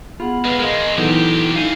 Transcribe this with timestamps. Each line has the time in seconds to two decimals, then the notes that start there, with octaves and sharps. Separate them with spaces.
0.20 B3 F4 G#4 F#5
0.45 G#3 F4 B4
0.60 D#3 G#3 G#4 A#4 D#5 F5 C6
0.98 A#2 E3 F#3 B3 D#4 E4 G4 A4
1.56 D#4 E4 F5 G#5